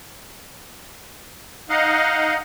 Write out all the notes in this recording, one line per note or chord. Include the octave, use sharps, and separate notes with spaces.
D#4 D#5 F5 F#5